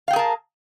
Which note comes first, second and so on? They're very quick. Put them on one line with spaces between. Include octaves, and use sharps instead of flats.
F5 G5 G#4 A#4 A5